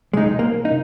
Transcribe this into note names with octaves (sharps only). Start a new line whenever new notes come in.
C3 G#3 D#4
C3
A#3
D#4